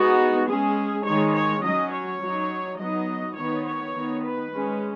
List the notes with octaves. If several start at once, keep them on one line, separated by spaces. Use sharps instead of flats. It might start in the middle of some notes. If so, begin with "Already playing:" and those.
Already playing: G#3 B3 D#4 F#4
G#3 C#4 G#4
D#3 G#3 D#4 C#5
C#5
F#3 C#4 D#5
C#5
F#3 D#4
F#3 B3 D#4 D#5
D#3 B3 D#4 C#5
C#5
D#3 B3 D#4
B4
G#3 C#4